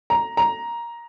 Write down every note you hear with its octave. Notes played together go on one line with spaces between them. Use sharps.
A#5
A#5